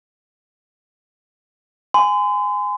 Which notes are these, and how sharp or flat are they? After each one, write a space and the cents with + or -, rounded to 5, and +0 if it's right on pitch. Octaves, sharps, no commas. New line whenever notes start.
G#5 -5 C6 -40